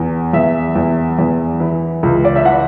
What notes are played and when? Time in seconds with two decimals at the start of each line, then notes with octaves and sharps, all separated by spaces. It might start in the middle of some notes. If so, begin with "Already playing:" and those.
Already playing: E2
0.33 E2 E5
0.76 E2
1.19 E2
1.60 E3
2.03 C#2
2.25 D5
2.36 E5
2.45 E3 F#5